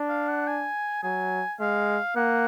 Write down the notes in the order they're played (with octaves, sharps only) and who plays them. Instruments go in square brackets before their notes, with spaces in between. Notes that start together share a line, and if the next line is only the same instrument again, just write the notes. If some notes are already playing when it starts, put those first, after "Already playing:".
Already playing: [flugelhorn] D4
[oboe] F5
F#5
G#5
[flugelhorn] F#3 [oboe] G#5
[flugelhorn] G#3 [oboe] F5
[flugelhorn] A#3 [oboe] F#5